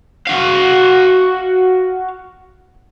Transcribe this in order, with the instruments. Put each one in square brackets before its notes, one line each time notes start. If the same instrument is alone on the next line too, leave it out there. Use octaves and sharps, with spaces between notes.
[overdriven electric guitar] F#4 F5